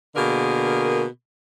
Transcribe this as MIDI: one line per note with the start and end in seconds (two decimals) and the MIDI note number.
0.15 1.03 47
0.15 1.03 50
0.15 1.03 58
0.15 1.03 68
0.15 1.03 70